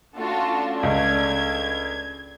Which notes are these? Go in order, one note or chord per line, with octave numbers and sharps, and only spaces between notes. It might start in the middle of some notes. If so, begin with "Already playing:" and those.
A3 C#4 D4 F4 F#4 A5
C#2 G#6